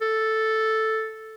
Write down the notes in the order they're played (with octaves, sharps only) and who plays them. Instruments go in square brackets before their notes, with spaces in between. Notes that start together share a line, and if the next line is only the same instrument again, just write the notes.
[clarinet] A4